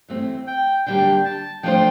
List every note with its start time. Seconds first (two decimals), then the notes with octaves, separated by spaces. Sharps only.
0.08 E3 A3 C4
0.47 G5
0.86 D3 G3 A#3 D4 G5
1.25 A5
1.63 F3 A3 D4 F4 C5 G5